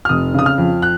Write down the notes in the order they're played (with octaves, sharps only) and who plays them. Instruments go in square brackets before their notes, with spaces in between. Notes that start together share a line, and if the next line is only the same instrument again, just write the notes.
[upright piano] F6
F1 D#6
C#3 D#6
F6
F2
F#6